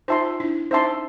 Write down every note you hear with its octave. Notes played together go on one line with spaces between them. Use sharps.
D#4 F4 C5 E5 A5 C6
D4 E4
C#4 D#4 C5 E5 A5 C6